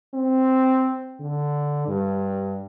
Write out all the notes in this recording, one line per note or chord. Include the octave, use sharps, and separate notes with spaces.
C4
D3
G2